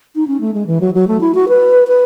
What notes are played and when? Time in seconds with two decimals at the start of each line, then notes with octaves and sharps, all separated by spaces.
0.15 D#4
0.27 C#4
0.41 A3
0.54 G#3
0.67 E3
0.81 F#3
0.94 F#3
1.08 A3
1.20 E4
1.35 F#4
1.48 B4
1.88 B4